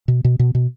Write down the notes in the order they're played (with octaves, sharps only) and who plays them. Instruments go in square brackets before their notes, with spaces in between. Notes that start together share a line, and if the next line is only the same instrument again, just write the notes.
[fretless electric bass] B2
B2
B2
B2